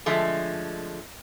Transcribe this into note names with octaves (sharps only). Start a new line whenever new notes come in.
D3 F3 G#3 A3